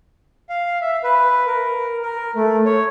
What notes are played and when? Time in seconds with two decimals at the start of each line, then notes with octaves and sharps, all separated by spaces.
0.49 F5
0.81 E5
1.04 B4
1.47 A#4
2.02 A#4
2.36 A3
2.65 C#5